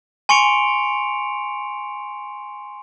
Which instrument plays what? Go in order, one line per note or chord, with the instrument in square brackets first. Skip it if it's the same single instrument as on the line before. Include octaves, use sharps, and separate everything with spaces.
[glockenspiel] G#5 C6 C#6 C#7 D7 F7